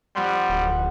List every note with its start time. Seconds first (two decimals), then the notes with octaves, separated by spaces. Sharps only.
0.15 F2 G3 F#5 C6
0.49 D1